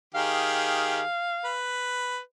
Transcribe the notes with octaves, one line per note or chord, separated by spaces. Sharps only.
D#3 G4 G#4 F5
B4